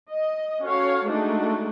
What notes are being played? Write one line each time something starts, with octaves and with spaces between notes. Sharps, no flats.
D#5
C#4 F#4 A4 C#5 F5
G#3 A3 D4 D#4 F#4